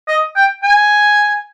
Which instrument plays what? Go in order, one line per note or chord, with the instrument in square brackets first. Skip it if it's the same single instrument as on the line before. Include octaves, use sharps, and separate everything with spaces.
[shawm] D#5
G5
G#5